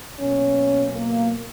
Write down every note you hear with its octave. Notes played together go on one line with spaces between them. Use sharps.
B2 F#3 A#3 C#4
A#3